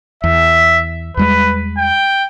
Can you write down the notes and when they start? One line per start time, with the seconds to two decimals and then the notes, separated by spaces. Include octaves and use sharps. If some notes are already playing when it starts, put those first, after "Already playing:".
0.24 E2 E5
1.17 E2 G3 G#3 B4
1.78 G5